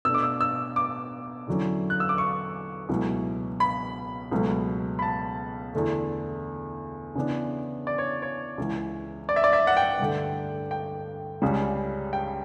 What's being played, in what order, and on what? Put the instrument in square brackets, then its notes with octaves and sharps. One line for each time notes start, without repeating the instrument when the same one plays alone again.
[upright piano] B2 A3 D4 [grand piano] E6
[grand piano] D6
E6
E6
D6
[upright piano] E2 D3 F#3 C#4 E4
[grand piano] F#6
E6
D6
C#6
[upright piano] C#2 B2 F#3 A3 E4
[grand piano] B5
[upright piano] C#2 B2 F#3 A3
[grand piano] B5
A5
[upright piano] E2 D3 A3
C#3 E3 B3 D4
[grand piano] D5
C#5
C#5
[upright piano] C#2 C#3 E3
[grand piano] D5
E5
D5
E5
F#5
G5
[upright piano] G2 D3 A3
[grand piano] G5
[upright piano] C#2 C#3 G3 C#4
[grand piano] G5